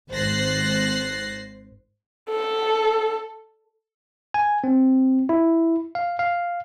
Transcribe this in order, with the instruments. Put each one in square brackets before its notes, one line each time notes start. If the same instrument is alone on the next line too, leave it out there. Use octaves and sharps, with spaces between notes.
[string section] G#1 C5 F#6 A6 A#6 C7
[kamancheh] A4
[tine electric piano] G#5
C4
E4
F5
F5